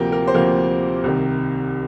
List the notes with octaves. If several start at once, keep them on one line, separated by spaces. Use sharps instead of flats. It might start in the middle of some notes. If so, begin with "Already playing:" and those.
Already playing: D2 C3 F3 A#3 G4 A#4 G5
A#4
C5
D2 C3 F3 A#3 A#4
C2 C3 D#3